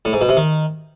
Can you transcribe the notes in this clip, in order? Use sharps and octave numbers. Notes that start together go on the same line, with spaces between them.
A2
G#2
B2
C3
D#3